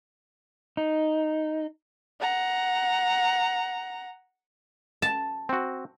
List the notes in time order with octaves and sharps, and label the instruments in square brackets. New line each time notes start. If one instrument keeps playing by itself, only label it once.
[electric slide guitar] D#4
[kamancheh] F#5 A#5
[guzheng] A5
[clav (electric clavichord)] C4 F#4